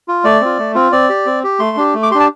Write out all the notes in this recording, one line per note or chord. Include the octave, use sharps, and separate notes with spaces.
F4
A3 D5
C4 F4
A3
C4 F4
C4 D5
G4
C4
G4
A3 C6
D4 G4
A3
D6
D4 G4 A5 C6